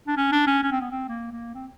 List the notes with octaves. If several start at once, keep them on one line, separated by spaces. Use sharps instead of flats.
D4
C#4
D4
C#4
C#4
C4
B3
C4
A#3
A#3
C4